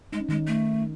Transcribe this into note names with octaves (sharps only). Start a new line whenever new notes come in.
G#3 D#4
C#4
D#3 G#3 D#4
A3